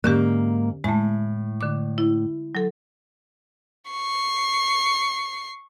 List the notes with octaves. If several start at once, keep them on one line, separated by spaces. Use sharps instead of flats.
G#2 D3 A#3 C#4 G4
A2 G#3 A3
D3 D6
E4
F#3 A4
C#6 C7